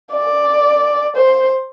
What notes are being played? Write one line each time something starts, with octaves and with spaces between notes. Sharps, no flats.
D5
C5